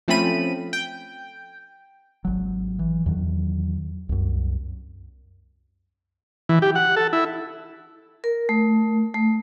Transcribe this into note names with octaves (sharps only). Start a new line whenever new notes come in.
F3 A3 C4 C#4 B5 D#7
G5
G#1 F#3
E3
E2 D#3 F#3
C2 F#2
E3
G4
F#5
A4
E4
A#4
A3
A3